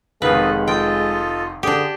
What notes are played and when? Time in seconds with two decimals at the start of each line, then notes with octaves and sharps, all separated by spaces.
0.22 F1 D#3 G#3 B3 A4 B4 D#5 F5
0.68 F4 A4 D#5 G5
1.63 D3 D4 G4 G#4